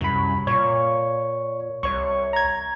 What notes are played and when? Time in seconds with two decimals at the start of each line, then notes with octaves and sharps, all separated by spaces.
0.01 C2 F#2 B5
0.47 A#2 C#5 C#6
1.83 C2 C#5 C#6
2.33 A#5 G#6